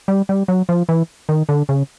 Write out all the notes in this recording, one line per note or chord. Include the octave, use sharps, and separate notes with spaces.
G3
G3
F#3
F3
E3
D#3
D3
C#3